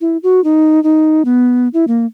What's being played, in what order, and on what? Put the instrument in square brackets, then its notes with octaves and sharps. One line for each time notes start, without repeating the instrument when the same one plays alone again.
[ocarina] E4
F#4
D#4
D#4
B3
E4
A#3